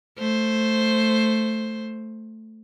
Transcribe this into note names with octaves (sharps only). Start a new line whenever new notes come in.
A3 C5